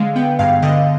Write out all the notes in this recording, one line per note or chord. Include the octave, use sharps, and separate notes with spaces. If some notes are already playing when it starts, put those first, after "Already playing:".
Already playing: D3 G#3 F5
B3 G5
G2 F5
D3 D#5